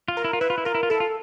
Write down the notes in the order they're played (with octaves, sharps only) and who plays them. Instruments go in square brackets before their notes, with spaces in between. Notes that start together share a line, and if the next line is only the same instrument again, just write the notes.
[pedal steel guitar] F4
[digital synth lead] A#4
[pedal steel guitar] E4
F4
[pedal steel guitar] E4 [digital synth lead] B4
[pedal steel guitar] F4
E4
[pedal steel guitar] F4 [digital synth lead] A#4
[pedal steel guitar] E4
F4
[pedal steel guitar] E4 [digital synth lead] A4
[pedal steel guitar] F4